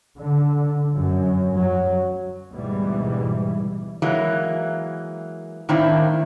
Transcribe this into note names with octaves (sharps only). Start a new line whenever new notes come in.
D3
F#2
F#3
D2 G#2 B2 E3 G3
E3 F#3 G#3 A#3
A2 D#3 A#3 C4 D4 E4